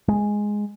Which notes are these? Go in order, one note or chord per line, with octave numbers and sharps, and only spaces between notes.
G#3